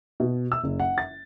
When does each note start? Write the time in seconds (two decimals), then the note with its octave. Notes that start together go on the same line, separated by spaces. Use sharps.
0.20 B2
0.52 E6
0.64 F#1
0.80 F#5
0.98 A6